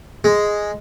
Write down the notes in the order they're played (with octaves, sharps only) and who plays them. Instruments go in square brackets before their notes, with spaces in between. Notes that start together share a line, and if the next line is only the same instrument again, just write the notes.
[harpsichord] G#3